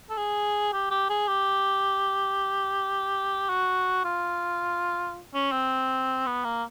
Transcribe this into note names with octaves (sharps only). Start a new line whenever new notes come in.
A4
G#4
G4
G4
G#4
G4
F#4
F4
C#4
C4
B3
A#3